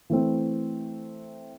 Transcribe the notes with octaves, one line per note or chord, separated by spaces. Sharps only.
E3 A3 C4